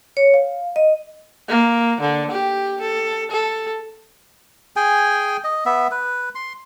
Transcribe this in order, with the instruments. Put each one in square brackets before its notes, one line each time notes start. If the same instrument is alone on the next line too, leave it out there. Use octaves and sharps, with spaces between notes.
[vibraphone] C#5
F5
D#5
[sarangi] A#3
D3
G4
A4
A4
[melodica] G#4 G5 G#5
D#5
B3 E5
B4
C6